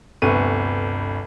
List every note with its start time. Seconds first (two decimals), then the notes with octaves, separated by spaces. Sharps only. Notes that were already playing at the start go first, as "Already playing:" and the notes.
0.22 G1 D2 C3 B4 C#6 D#7